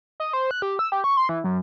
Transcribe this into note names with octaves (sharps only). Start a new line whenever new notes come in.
D#5
C5
F#6
G4
E6
G4
C#6
C6
E3
F#2